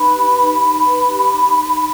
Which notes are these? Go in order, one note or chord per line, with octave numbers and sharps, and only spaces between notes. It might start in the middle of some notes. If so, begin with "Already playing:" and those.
Already playing: D#4 B4 B5
G4
D#4
D#4
B4
G4
D#4
D#4